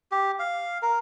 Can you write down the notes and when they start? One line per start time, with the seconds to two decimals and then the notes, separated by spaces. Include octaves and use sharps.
0.11 G4
0.39 F5
0.83 A#4